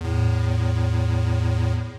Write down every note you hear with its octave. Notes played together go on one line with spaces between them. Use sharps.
E2 A2